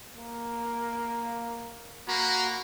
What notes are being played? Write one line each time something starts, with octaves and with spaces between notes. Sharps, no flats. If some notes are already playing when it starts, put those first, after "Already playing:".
A#3
A#3 F#4 A#5 B5